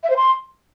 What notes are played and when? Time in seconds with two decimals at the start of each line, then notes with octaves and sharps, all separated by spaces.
0.03 E5
0.10 C5
0.17 C6